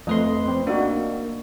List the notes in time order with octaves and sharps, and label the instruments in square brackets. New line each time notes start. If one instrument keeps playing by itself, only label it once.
[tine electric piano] F2 B4 C6 [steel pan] A3 D#5
[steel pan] C4
[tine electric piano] A#3 [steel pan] D4 D#4 F#4